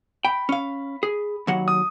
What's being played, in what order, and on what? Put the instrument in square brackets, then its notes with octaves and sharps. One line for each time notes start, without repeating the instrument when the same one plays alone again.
[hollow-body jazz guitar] G5 [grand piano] B5
[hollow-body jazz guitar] C#4 F5
G#4
D#2 F#3 F#5
[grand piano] D#6